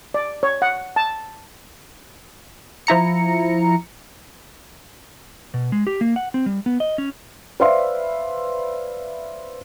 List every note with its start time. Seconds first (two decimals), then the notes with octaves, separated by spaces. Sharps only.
0.14 D5
0.43 C#5
0.62 F#5
0.96 A5
2.87 F3 E4 A#5 C#7
5.54 B2
5.72 G#3
5.87 G4
6.01 A#3
6.16 F#5
6.34 C4
6.46 G3
6.66 B3
6.80 D#5
6.98 C#4
7.60 B4 C5 D5 E5 F5 C6